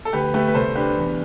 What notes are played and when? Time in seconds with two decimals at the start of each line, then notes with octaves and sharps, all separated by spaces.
0.05 A4
0.13 D2 G4 B4
0.34 A3 G4 B4
0.48 B4
0.54 C2 A4 C5
0.75 D4 G4 B4
0.96 E2